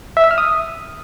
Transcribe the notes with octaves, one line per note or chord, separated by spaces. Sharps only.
E5
E6
F6
D#6